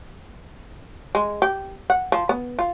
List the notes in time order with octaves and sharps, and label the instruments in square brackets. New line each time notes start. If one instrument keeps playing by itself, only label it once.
[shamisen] G#3
G4
F#5
F3
B3
F4